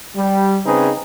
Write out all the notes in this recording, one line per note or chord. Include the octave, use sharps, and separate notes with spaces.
G3
C#3 C4 D#4 G#4 B4